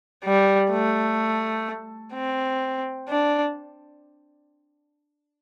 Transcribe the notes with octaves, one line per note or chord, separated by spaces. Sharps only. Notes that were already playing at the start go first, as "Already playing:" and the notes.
G3
A3
C4
D4